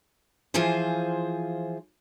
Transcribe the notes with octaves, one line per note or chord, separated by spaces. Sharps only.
E3 F3 F4 G#4 C5